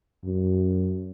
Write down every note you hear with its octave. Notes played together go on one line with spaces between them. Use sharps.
F#2